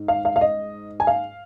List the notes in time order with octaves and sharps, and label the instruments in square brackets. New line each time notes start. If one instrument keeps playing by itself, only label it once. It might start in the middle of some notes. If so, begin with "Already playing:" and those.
Already playing: [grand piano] G#2
F5
F5
F5
D#5
G#5
F5